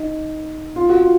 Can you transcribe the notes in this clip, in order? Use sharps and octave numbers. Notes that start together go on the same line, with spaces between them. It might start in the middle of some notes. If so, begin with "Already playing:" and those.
Already playing: D#4
F4
F#4
F4